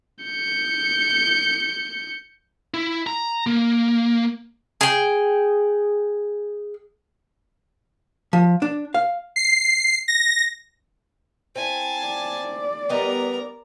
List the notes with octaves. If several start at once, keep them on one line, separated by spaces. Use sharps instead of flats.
G6 C#7
E4
A#5
A#3
G#4 G5
F3
D4
F5
C7
A#6
C4 E4 G#5 A5
D5
G3 B3 A#4 D#5 A#5